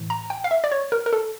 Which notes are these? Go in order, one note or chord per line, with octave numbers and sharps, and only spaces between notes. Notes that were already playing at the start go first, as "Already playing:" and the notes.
Already playing: A2 E3
A#5
G5
F5
E5
D5
C#5
A#4
A#4
A4